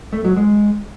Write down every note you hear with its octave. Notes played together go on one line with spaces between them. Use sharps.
A3
F#3
G#3